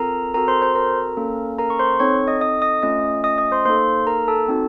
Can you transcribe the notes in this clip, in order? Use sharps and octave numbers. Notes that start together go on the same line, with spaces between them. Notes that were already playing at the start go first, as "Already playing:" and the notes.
Already playing: C4 F4 A4 A#4 A#5
C4 F#4 A4 A#4 A#5
C5 C6
C5 C6
A#4 A#5
A#3 C#4 A4
A#4 A#5
C#6
C5 C6
C4 D#4 A4 C#5 C#6
D#5 D#6
D#5 D#6
D#5 D#6
A3 C#4 F4 D#5 D#6
D#5 D#6
D#5 D#6
C5 C6
A#3 D#4 A4 C5 C6
A#4 A#5
A4 A5
C4 D#4 F#4 A4